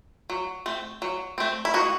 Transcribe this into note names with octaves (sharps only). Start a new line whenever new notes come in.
F#3
A3 C4
F#3
A3 C4
E4
D#3 F#4